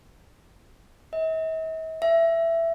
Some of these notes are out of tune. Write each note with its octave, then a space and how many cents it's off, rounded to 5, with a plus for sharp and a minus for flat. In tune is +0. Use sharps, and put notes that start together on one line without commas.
E5 -45
E5 +15